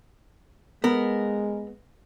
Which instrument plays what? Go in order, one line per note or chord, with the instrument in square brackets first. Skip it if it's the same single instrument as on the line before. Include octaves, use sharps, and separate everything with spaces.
[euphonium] G#3 [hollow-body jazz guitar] B3 [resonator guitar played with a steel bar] A#4